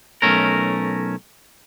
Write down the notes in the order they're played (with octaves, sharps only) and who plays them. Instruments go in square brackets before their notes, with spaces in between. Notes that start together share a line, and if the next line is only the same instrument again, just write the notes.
[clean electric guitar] B1 G#2 A3 C#4 A#4